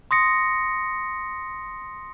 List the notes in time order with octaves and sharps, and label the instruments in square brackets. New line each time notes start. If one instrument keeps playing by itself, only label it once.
[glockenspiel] C6 D#6 A#6 C#7